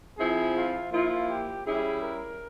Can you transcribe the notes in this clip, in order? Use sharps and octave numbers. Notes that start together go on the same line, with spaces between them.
F3 C4 E4 G#4
F4
F3 A#3 E4 F4
G4
G3 C#4 E4 G#4
A#4